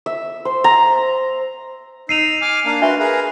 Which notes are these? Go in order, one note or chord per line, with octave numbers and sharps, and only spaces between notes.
E5
C5
A#5
D#4 E6 C7 D#7 F7
G#5 D6 F6
A#3 D4 F5
D4 F#4 B4 E5 C6
G#4 A#4 B4